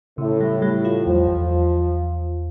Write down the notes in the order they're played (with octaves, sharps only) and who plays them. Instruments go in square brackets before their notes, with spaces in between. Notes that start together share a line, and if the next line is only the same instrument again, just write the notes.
[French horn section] A2 [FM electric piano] C#3
[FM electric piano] G3
[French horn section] A2 [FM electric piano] G3
[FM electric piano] F4
[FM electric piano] E2 [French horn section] F3
[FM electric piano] E2